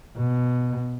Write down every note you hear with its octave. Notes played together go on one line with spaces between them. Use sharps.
B2